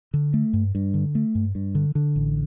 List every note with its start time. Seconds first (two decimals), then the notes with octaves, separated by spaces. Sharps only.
0.14 D3
0.34 A3
0.53 G2
0.75 G2
0.94 D3
1.15 A3
1.35 G2
1.55 G2
1.75 D3
1.95 D3
2.16 A1